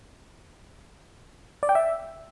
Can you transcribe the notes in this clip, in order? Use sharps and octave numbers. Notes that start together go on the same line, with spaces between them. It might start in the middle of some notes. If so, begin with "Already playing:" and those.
D5
G5
E5